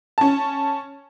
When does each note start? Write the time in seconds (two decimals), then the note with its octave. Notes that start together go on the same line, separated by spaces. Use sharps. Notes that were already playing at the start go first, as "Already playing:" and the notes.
0.18 C#4 A5